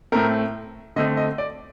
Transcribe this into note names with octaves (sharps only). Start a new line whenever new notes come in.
A2 A3 C4 A#4
D3 A3 C4 D#5
D#5
D5